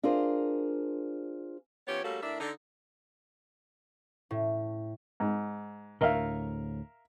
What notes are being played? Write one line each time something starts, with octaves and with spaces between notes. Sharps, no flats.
D4 F4 G#4 A#4 C5
F3 B3 C#4 G4 C#5
G3 A3 A#3 C#4 F#4 A4
A2 D4 A#4 D5 E5
D3 D#4
A2
G#2
D2 A2 A#4 E5 F5